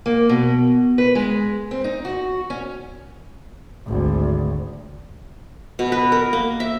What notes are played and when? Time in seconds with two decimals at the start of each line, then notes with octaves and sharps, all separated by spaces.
0.06 A#3
0.29 B2
0.98 B4
1.15 G#3
1.71 C4
1.84 D#4
2.05 F#4
2.50 C#4
3.86 G#1 D2
5.79 B2
5.92 B4
6.12 A#4
6.33 A#3
6.60 E5